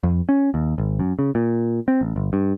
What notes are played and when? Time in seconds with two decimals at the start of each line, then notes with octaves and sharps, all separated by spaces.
0.03 F2
0.29 C#4
0.54 D#2
0.78 G#1
0.99 F#2
1.19 C#3
1.35 A#2
1.88 C4
2.01 A1
2.16 G1
2.33 G2